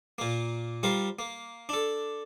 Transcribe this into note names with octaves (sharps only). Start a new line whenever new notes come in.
A#2 A#3
G3 F4 A#4 C5
A#3
D4 A4